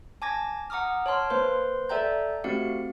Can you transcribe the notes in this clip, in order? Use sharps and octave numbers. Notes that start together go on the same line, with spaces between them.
G#5 A5 D6 G#6 A#6
F#5 A#5 D6 D#6 F6
C#5 A5 C6 F6
A#3 B4 C5 C6
A4 D5 E5 G5 A#5 G6
A3 C4 F#4 G4 F5 C#7